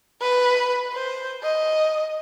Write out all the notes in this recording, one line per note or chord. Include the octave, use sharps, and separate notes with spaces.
B4
C5
D#5